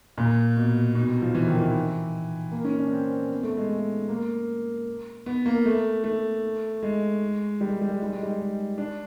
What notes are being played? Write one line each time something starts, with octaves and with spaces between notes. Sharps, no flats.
A#2
B2
B2
C3
F3
E3
D#3
E3
A#3
C#4
D4
C4
B3
A3
G#3
A3
A#3
B3
A#3
A3
A3
G#3
G3
G#3
G3
G#3
G3
G#3
G3
G#3
D4